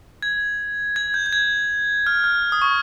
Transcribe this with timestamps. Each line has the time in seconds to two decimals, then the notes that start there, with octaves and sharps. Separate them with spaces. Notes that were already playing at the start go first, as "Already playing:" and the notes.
0.22 G#6
0.96 G#6
1.14 G6
1.26 G6
1.33 G#6
2.07 F6
2.24 F6
2.52 D#6
2.62 C#6